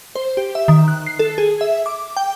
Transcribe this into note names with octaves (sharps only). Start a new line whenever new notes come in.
C5
G4
E5
D#3
F#6
C7
A4
G#4
E5
D6
G5